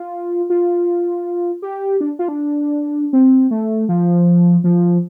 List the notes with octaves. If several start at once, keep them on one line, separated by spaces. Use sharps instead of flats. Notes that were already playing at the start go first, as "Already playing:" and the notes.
Already playing: F4
F4
G4
D4
F4
D4
C4
A3
F3
F3